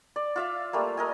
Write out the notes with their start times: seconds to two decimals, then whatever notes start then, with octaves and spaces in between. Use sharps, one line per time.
0.16 D5
0.36 F4 E5 F5
0.73 G3 A3 A#3
0.97 A#4 D#5 G#5